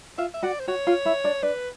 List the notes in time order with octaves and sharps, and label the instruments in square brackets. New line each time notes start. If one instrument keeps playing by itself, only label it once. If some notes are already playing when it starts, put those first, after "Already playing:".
[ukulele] F4 F5 [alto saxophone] E5
[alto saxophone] E5
[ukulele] F#4 F#5 [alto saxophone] D5
[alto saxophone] C5
[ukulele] F#4 F#5 [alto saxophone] C#5
[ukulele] F4 F5
E4 E5
D4 D5
[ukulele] D4 D5 [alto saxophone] B4